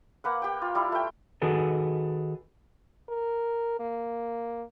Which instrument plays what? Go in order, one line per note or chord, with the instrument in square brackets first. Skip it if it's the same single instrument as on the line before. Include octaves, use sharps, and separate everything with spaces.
[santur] A#3 B4 F#5
G4 G5
F4
G3 E4 F4
A3 G5
[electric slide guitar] D#3 F#4 G#4 A4 B4
[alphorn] A#4
A#3